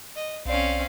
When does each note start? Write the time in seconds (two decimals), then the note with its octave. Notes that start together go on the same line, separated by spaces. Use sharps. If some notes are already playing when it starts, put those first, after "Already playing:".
0.16 D#5
0.46 B1 C4 C#4 D5 F5